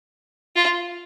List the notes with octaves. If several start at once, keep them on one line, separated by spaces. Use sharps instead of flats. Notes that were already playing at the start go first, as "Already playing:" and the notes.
F4